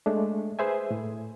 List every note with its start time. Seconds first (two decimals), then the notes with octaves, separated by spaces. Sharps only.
0.06 G#3 A3 D4
0.59 G#4 B4 C5 E5 G#5
0.91 A2